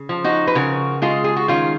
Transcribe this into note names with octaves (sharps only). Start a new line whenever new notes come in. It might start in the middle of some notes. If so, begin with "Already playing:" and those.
Already playing: C#3
F3
D#4 F#4
B4
C#3 F#4 A#4
G#3 F4 G#4
G#4
F#4
D#3 C#4 F4